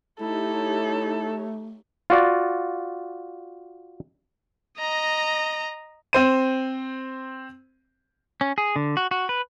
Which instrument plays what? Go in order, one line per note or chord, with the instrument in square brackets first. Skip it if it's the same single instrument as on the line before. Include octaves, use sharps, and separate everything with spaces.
[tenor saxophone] A3 [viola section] D#4 G4 C#5 [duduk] E4 [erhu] A4
[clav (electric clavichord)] F4 F#4 D5
[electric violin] D#5 A#5
[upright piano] C4 C5 D#7
[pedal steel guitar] C#4
G#4
D3
F#4
F#4
B4